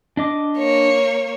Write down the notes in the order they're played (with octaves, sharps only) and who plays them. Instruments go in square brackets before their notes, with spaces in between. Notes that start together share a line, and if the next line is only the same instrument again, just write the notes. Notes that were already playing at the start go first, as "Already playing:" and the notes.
[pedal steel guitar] D4 D#5 D6
[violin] A#3 C#5